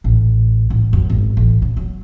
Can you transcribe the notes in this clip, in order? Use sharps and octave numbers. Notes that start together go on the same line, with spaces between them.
A1
A1
F#2
G#1
A1
C#3
F#3